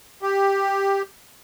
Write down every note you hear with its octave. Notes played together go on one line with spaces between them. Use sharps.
G4